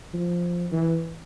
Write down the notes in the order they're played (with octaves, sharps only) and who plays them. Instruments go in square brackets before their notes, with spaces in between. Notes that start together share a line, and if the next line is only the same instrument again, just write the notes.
[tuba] F3
E3